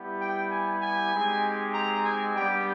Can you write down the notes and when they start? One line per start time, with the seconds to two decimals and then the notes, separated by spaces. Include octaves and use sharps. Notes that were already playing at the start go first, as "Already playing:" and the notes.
Already playing: G3 B3 E4 G4
0.20 G5
0.51 G#5
0.82 G#5
1.13 G#3 C4 D#4 G4
1.74 A#5
2.04 G#5
2.35 G3 B3 D4 G4 G5